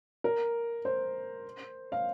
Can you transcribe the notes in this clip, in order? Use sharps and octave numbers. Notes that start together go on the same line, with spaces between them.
A#4
C5
F5